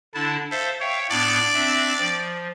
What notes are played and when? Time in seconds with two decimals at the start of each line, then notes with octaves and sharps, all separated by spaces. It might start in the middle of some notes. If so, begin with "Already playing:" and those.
0.14 D3 D4 E4 A5
0.51 A4 C5 E5 F5
0.81 C#5 E5 F5 G5
1.11 A2 B3 D4 D5
1.54 C4 D4 E5
1.99 F3